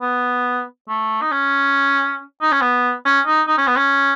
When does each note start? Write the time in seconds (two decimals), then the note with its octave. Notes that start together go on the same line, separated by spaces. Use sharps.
0.01 B3
0.89 A3
1.21 D#4
1.31 C#4
2.42 D#4
2.52 C#4
2.61 B3
3.05 C#4
3.27 D#4
3.48 D#4
3.58 C#4
3.67 B3
3.76 C#4